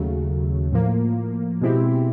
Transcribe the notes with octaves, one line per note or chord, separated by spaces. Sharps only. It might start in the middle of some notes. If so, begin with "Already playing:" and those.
Already playing: D#2 C#3 F#3 A3
A2 F3 A#3
B2 G#3 C4 E4 G4